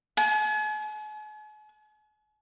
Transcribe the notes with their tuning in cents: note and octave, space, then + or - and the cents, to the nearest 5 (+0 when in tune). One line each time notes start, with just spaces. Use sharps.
G#5 +45